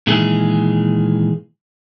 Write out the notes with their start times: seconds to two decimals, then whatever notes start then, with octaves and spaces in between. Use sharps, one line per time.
0.07 A#2 D#3 E3 G#3 G#4